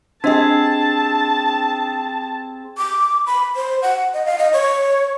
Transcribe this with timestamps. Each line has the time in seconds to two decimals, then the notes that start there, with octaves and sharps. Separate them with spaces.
0.24 C4 D4 G#4 D#5 A5
2.78 D6
3.27 B5
3.56 C5
3.82 F#5
4.14 D#5
4.26 F5
4.38 D#5
4.53 C#5